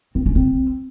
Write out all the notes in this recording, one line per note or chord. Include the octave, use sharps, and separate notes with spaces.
C4
C#4
C4